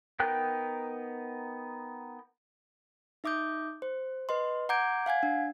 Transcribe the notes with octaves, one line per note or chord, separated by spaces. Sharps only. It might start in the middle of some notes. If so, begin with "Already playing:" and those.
B3 D#4 A#4 G5 F#6
D#4 E5 D6 D#6 G6
C5
B4 D#5 C6
F#5 A#5 D6 G6 G#6 D7
F5 F#5 G#5 G#6
D4